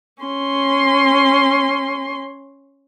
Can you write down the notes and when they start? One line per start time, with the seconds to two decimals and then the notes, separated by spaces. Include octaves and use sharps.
0.22 C#4 C6